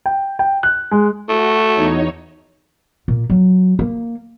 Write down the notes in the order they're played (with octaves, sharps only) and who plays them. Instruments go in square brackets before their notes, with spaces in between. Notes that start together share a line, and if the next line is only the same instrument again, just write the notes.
[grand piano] G5
G5
F#6
G#3
[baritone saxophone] A3 [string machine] F#4
[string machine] E2 D#4 C#5
[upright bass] A#2
F#3
A#3